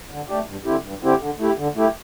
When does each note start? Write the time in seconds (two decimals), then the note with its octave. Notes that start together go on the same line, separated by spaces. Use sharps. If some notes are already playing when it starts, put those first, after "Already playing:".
0.11 D3
0.29 A3 D4 G4
0.47 G2
0.65 D3 C4 E4 G4
0.84 G2
1.02 D3 C4 E4 G4
1.20 D3
1.38 A3 E4 G4
1.58 D3
1.76 A3 E4 G4